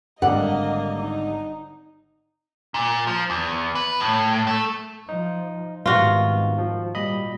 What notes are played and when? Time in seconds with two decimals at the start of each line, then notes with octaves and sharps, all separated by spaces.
0.22 G#1 D3 G3 A#3 D5 D#5 F#5
0.99 D#4
2.74 A#2
3.07 F3
3.30 E2
3.75 B4
4.00 A2
4.47 A3
5.09 F3 D#4
5.86 G#2 C3 D#3 G3 B3 F4 F#4
6.58 F3
6.95 A#2 G3 D#5 B5